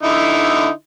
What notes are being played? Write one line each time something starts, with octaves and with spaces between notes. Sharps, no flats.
D3 D#4 E4